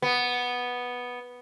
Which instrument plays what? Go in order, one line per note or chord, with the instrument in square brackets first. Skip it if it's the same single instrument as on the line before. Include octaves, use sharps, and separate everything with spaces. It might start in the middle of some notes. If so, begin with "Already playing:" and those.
[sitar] B3